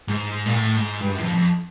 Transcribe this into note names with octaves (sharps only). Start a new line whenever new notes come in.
G#2
A#2
A2
G#2
G2
F#2
E2
F2
F2